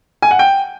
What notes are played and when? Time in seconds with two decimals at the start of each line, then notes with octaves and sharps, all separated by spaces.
0.22 G#5
0.31 F#5
0.39 G5